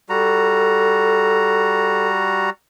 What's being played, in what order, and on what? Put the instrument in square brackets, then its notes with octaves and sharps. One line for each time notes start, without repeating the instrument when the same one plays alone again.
[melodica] G3 F#4 A#5 [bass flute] A4